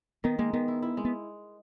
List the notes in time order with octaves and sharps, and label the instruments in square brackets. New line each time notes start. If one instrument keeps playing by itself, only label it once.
[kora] D#3 [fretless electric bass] B3
[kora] G#3 [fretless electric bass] A#3
[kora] D#3 [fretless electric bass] B3
[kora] E4
E4
G#3
[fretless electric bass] B3